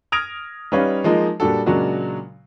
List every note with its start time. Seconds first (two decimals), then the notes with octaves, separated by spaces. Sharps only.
0.12 D#6 F6 G#6 A#6 D7 F7
0.72 G3 C#4 D#4 B4 C#5 F5
1.04 F3 G#3 A#3 D#4
1.40 A#2 G3 D4 F#4 A4
1.66 A#2 C#3 F#3 G#3 D4 F#4